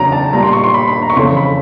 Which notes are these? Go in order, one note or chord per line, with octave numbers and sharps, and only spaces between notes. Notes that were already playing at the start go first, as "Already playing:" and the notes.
Already playing: E2 C#3 F#3 A#5
A5
A#2 G3 A#5
C6
C#6
C6
B5
B5
A#5
C#6
F2 C#3 E3 A3 C6
B5